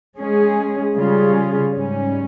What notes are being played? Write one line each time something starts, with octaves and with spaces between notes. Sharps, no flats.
G#3 C#4 G#4
C#3 G3 C#4 F4 G#4
G#2 G3 C#4